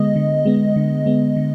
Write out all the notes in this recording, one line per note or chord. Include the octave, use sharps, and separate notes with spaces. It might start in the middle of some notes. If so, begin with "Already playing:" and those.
Already playing: D3 G#3 B3 D#5
D3
G#3 B3
D3
G#3 B3
D3